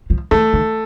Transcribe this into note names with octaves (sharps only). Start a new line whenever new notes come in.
F3
E3 A3
D#3